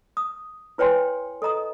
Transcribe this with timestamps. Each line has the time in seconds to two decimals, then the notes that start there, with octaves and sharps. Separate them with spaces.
0.17 D#6
0.78 E4 B4 C#5 G5 G#5 C6
1.42 A4 D#5 A#5 D#6